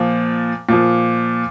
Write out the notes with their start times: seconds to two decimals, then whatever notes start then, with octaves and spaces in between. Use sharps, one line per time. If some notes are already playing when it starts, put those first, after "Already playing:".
Already playing: A#2 F3
0.69 A#2 F3